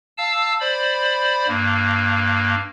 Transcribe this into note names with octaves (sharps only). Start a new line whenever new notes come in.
F5 A5 E6
C5 D5 B5
G2 A#3